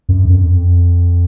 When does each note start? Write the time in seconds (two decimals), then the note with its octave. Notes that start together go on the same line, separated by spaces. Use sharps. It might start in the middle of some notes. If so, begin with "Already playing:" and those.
0.09 F#2
0.25 F2
0.35 F#2
0.45 F2